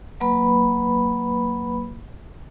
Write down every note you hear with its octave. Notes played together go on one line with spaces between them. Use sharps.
F#3 A#3 B4 B5